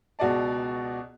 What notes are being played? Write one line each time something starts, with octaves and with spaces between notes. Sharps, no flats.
C#2 B2 F#4 G#4 D5 A5